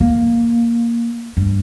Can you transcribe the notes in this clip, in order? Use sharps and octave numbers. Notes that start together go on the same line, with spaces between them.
A#3
G2